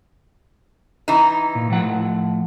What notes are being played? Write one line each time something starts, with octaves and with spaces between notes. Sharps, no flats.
E3 D#4
A#2
A2 F3 F#5